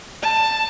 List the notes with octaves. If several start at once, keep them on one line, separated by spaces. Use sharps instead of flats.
A5